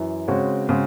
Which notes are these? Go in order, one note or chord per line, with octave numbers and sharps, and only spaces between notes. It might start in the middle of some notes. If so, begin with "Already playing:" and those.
Already playing: F#2 E3
C#3 G#3 C4 F#4 C#5
C#3 G#3 C4 F#4